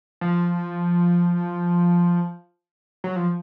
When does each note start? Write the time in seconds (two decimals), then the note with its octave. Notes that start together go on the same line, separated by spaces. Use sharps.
0.21 F3
3.04 F#3
3.16 F3